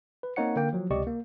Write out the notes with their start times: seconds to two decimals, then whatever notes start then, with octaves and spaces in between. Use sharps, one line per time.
0.23 B4
0.36 A#3 C4 D#4 C#5 F#5 C#7
0.56 D3 A#3 G5
0.73 F3 F#3
0.90 C#2 C3 G4 D5 D#5 C#6
1.07 A#3